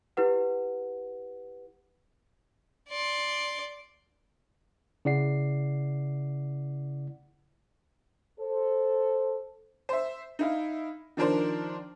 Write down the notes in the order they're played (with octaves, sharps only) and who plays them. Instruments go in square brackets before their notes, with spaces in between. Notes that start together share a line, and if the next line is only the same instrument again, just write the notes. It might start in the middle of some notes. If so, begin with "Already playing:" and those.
[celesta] E4 G4 B4 F#5
[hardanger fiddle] D5 C6
[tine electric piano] C#3 E4 D5 F#5 C7
[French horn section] A4 C5
[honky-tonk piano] C5 E5
D#4 E4 F5
D#3 F3 D4 A#4 C5 D5